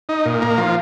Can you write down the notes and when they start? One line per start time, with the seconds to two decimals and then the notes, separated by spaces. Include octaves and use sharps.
0.09 D#4
0.25 A#2
0.42 A#3
0.58 F3